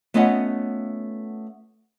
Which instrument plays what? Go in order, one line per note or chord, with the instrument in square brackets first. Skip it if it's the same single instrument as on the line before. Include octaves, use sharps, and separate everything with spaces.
[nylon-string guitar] A3 B3 C#4 F4 D#5 F#5